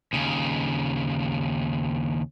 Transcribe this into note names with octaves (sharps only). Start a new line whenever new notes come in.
D#2 C#3